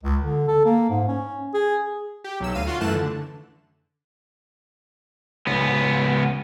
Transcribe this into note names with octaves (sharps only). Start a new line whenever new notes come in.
C#2
D3
A4
A#3
G#2
C#4
G#4
G4
B1 F#3 E6
D2 F5 D#7
F4 F#4 F5 C6
F#2 E3 A3 A5 F#6 E7
D3
C#2 B3